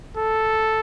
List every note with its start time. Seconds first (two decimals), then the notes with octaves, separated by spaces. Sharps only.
0.17 A4